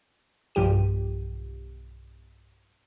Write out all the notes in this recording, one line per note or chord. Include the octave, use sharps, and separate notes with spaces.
B1 G2 F3 G4 D#7